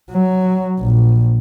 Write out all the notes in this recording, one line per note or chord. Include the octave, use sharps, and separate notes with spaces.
F#3
A#1